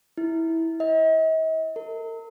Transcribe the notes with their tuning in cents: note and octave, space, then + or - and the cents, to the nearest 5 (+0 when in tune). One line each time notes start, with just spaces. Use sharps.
E4 -15
D#5 +45
A#4 -40